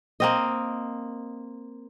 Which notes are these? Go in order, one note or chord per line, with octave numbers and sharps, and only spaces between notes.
A#3 C4 D#5